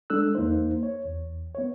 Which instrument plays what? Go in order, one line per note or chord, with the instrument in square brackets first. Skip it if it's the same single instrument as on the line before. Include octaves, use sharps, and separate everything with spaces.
[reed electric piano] G#3 D4 A4 E6 F#6
E2 A#3 D#4 C5
C#5
E2
B3 C#5